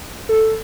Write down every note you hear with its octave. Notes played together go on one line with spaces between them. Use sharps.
A4